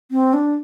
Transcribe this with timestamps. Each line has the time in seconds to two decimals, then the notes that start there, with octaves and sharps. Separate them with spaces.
0.11 C4
0.34 D4